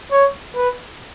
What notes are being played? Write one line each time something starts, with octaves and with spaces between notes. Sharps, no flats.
C#5
B4